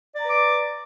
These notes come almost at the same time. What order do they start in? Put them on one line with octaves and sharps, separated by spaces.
D5 A#5 B4 D6